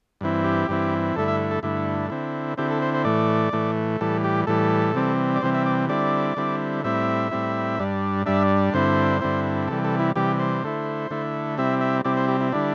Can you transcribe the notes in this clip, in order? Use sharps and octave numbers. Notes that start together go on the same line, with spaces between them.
G2 E3 C4 E4
G4
G2 E3 C4 E4
G2 D3 A3 E4 A4
E5
A4
G2 D3 A3 E4
D3 C4 E4
D3 C4 E4 G4
A4
C5
C5
A2 E3 A3 D5
A2 E3 A3
A2 E3 G3 A4
G4
A2 E3 G3 A4
C3 E3 G3 C4
D5
C3 E3 G3 C4 C5
E5
D5
D3 G3 C4 E4 D5
D3 G3 C4 E4
A2 G3 C4 E4 E5
A2 G3 C4 E4
G2 G3 D4
G2 G3 D4 E5
G2 D3 C4 E4 C5
G2 D3 C4 E4
C3 E3 G3 A4
A4
E4
C3 E3 G3 G4
C5
D3 A3 E4
D3 A3 E4
C3 G3 C4 E4 E5
E5
C3 G3 C4 E4 D5
C5
G4
E4
D3 G3 D4 E4